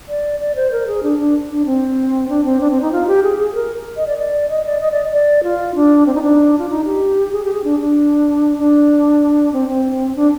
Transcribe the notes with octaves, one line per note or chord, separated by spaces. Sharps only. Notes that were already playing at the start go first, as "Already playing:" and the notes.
D5
D5
C5
A#4
G#4
D4
D4
D4
C4
D4
C4
D4
C4
D#4
F4
G4
G#4
G#4
A#4
D#5
D5
D5
D#5
D5
D#5
D5
D5
F4
D4
C4
D#4
D4
F4
D#4
G4
G#4
G4
G#4
D4
D4
D4
C4
C4
D4